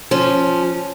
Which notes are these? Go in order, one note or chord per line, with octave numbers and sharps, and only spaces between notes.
F3 C#4